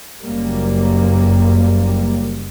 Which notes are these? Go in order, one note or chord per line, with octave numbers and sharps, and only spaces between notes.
F#1 F#2 G3 A#3